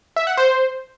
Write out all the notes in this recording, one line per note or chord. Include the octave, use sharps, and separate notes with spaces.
E5
F#5
C5